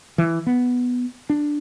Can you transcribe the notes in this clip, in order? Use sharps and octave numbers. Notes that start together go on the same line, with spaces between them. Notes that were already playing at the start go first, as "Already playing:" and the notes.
E3
B3
D4